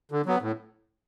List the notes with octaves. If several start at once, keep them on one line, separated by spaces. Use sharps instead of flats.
D3
F#3 B3
A2